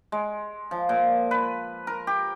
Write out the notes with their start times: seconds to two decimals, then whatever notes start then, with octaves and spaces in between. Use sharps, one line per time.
0.12 G#3
0.71 F3
0.89 A#2
1.31 B4
1.87 A#4
2.07 G4